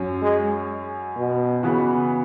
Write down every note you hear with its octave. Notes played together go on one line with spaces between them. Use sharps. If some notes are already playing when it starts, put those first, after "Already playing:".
Already playing: F#2 F#3 C#4
G#3
B2
C#3 E3 B3 F#4